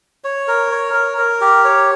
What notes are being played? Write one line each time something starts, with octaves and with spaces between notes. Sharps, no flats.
C#5
A#4
C#5
A#4
A#4
G4
C#5